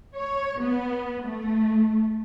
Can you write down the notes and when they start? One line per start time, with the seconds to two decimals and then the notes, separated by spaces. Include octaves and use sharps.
0.16 C#5
0.61 B3
1.24 A3